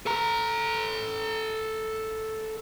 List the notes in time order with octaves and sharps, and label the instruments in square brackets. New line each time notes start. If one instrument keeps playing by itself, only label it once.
[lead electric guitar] A4 A#5